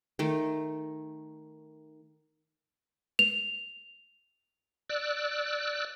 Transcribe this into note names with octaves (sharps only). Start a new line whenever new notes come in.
D#3 A3
F7
D5 E6 F#6